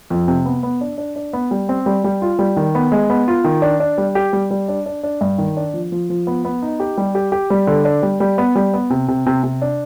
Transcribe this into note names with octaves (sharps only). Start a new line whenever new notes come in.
F2
C3
B3
B3
D4
D4
D4
B3
G3
C4
G3
G3
F4
G3
D#3
B3
G#3
B3
F4
D#3
D4
D4
G3
G4
G3
G3
D4
D4
D4
G2
D#3
D4
F3
F3
F3
B3
B3
D#4
G4
G3
G4
G4
G3
D3
D4
G3
G3
B3
G3
B3
C3
C3
C3
C3
D4